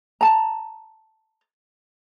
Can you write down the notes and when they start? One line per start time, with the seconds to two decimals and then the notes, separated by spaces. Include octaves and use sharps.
0.21 A5 A#5